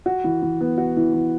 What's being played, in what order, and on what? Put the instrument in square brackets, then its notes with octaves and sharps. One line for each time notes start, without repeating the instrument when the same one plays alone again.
[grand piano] F#4
E3
E3
B3
F#4
E3
E3